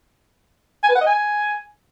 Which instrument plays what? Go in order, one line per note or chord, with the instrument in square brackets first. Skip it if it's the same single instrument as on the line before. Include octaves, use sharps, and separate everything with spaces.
[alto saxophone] G#5
B4
F#5
D#5
G#5